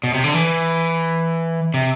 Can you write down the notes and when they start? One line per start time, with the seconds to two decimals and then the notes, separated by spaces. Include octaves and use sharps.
0.03 B2
0.14 C3
0.24 D3
0.34 E3
1.74 C3